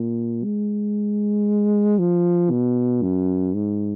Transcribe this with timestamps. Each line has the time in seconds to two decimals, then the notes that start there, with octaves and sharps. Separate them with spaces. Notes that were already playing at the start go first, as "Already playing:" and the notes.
Already playing: A#2
0.44 G#3
1.99 F3
2.51 B2
3.02 F#2
3.54 G#2